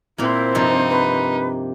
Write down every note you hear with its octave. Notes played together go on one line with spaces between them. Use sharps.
A#2 A#3 C4 E4 C5
G2 C3 F3 D#4
B4